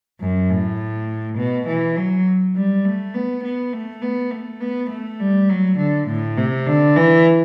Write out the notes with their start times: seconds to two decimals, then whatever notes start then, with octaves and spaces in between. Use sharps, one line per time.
0.20 F#2
0.50 A2
1.38 B2
1.68 E3
1.96 F#3
2.55 G3
2.85 A3
3.14 B3
3.44 B3
3.73 A3
4.02 B3
4.31 A3
4.61 B3
4.90 A3
5.20 G3
5.49 F#3
5.78 D3
6.08 A2
6.37 C3
6.67 D3
6.96 E3